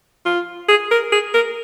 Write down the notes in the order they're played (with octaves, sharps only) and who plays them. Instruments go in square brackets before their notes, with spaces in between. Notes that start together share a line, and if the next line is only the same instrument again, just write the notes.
[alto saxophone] F4
G#4
A#4
G#4
A#4